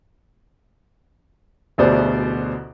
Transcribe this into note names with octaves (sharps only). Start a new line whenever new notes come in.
A1 D2 B2 G#4 C5 D5